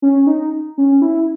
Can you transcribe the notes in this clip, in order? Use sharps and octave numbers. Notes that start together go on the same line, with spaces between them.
C#4
D#4
C#4
E4